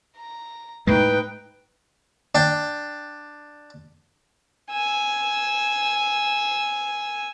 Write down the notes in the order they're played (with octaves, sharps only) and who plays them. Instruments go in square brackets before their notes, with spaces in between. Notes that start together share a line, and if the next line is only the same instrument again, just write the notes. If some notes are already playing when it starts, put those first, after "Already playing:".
[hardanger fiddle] A#5
[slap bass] A2 G#3 [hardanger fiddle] D#4 G5 [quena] B4
[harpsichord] D4 G5
[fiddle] G#5 E6